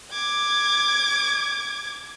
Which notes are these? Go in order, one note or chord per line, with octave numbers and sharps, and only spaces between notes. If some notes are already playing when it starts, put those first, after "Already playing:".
D6 G#6